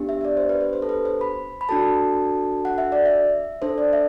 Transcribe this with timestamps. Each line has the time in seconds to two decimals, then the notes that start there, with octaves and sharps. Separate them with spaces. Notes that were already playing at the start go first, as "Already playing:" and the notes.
Already playing: B3 D4 G4
0.09 E5
0.21 E5
0.25 D5
0.37 C5
0.49 B4
0.61 B4
0.73 C5
0.82 A4
0.89 B4
1.05 C5
1.21 B5
1.61 B5
1.69 D4 F#4 A4 A5
2.65 F#5
2.78 E5
2.92 D5
3.05 E5
3.62 D4 A4 C5
3.78 D5
3.93 E5